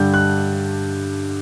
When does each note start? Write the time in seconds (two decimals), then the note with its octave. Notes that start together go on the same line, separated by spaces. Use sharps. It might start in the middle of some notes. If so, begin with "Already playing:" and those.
Already playing: G2 D3 G3 G6
0.14 F#6